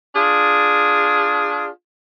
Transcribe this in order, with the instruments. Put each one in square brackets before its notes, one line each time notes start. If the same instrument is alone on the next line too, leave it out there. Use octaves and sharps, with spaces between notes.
[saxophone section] D4 F4 G#4